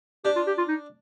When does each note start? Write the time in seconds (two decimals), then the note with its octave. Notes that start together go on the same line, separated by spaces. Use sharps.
0.25 D4 G4
0.36 F4
0.47 G4
0.57 F4
0.68 D#4